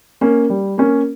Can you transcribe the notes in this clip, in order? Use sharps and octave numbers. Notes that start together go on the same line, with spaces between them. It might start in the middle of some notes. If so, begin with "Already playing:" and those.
A#3 C#4
G3
A#3 C#4